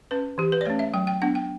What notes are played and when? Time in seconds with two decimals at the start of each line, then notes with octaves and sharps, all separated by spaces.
0.11 C#4 B4
0.38 E3 G4
0.52 B4
0.61 D5
0.65 A3 C#4 C#5
0.79 E5
0.94 F#3 G5
1.07 G5
1.22 B3 D4 F#5
1.35 G5